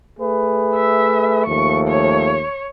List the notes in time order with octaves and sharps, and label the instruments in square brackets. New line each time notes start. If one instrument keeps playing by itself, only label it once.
[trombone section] A3 G#4 B4
[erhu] E5
[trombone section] D#2 F3 A3 [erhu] C#6
[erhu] C#5